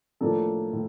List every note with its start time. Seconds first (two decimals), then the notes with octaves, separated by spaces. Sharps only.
0.21 A2 F3 A#3 D4 A4
0.73 A2